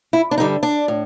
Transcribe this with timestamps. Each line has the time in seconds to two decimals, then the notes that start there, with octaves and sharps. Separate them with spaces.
0.13 E4
0.31 D4
0.38 G2 D3 G3 D#4
0.63 D4
0.88 A2